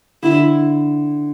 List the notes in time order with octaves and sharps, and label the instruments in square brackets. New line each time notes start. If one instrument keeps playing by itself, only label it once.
[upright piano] D3 [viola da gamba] E4